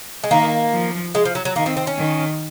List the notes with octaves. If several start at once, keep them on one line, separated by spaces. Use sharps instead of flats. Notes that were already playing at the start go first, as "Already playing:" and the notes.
G#3
D#3 A#3
F3
G#3
F3
F#3
F#3
D#3 A#3
C4
C4
C#4
D#3